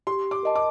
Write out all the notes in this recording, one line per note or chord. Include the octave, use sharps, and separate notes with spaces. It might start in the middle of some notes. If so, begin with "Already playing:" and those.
G4 C6
D6
A#4 D#5 A5
D6